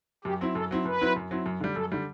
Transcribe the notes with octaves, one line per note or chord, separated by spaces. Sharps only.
F#2 G4
F#3 C4 E4
F#2 A4
F#3 C4 E4
F#2 B4
F#3 C4 E4
F#2
F#3 C4 E4
F#2
D3 G3
F#2 A4
D3 G3